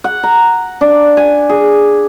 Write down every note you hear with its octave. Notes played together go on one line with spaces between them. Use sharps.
F#5
A#5
D4
G#5
G#4